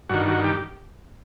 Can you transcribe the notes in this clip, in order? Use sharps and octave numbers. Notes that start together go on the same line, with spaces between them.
G2 D#3 F#4
F#4
G4